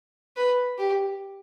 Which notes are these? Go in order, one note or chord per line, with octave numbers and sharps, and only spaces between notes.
B4
G4